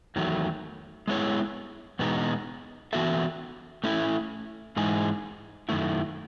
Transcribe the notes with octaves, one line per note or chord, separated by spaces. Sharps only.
E2 D#3 F#3 A3
G#3 B3 E4 G#4 C#5
E2 B2 G#3 B3 D#4
E3 B3 F#4 A4 E5
A3 C#4 E4
G#2 E3 G#3 D#4 G#4
F#2 D#3 A3 E4